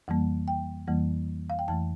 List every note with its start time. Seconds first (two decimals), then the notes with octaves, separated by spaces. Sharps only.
0.08 F2 E3 G3 A#3
0.48 G5
0.87 F2 E3 G3 A#3
1.50 F5
1.59 G5
1.68 F2 E3 A3 A5